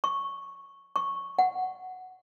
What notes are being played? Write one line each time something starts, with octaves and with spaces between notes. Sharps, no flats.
C#6
C#6
F#5